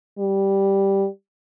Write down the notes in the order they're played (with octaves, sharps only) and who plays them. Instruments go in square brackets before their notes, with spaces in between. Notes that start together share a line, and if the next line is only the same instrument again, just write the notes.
[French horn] G3